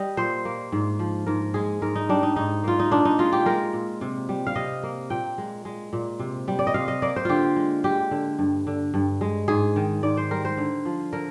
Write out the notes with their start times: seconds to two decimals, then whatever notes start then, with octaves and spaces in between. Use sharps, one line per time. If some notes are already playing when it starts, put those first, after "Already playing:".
Already playing: G3 D#5
0.17 A#2 C5
0.45 A#3
0.72 G#2
0.99 F3
1.27 G#2 A#4
1.54 G#3 G#4
1.82 G#2 A#4
1.95 D#4
2.09 G3 D4
2.23 D#4
2.36 G#2 D#4
2.64 A#3 F4
2.80 D#4
2.91 A#2 D4
3.05 D#4
3.19 G#3 F4
3.33 G4
3.46 G#3 A#4
3.73 A#2
4.01 C3
4.29 G3
4.47 F5
4.55 C3 D#5
4.83 A#3
5.10 A#2 G5
5.38 G#3
5.65 G#3
5.93 A#2
6.19 C3
6.48 G3
6.59 D5
6.67 D#5
6.74 C3 F5
6.88 D#5
7.02 A#3 D5
7.16 C5
7.25 D3 F4 G4
7.56 G#3
7.84 G#3 G4
8.11 D3
8.39 G2
8.67 D3
8.94 G2
9.21 G#3
9.48 G#2 G#4
9.76 D#3
10.03 G#2 D5
10.17 C5
10.31 G3 A#4
10.45 C5
10.58 D3
10.85 F3
11.13 D3 A#4